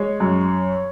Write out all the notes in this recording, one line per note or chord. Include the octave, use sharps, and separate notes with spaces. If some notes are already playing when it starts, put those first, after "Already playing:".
Already playing: G#3 C#5
F#2